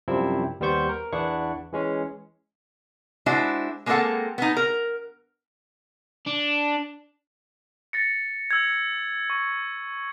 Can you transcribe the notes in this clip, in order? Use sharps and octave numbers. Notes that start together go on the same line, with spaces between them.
F#2 C3 F3 G3 C4 E4
D#2 G3 B3 C5 C#6 G6
A#4
E2 B3 D4 E4 F#5 C#6
E3 G#3 C#4
G#3 D4 E4 F#4 C5
G#3 A#3 C4 F4 A4 F#5
B3 D#4
A#4
D4
A6 A#6 C#7
E6 G#6
C#6